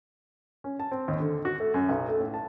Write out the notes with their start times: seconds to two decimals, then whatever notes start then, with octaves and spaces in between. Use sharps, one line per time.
0.64 C#4
0.80 A5
0.91 C4
1.08 D#2
1.20 D3
1.45 F#4
1.60 A3
1.74 F#2
1.89 B1
2.08 A3
2.20 A2
2.34 A5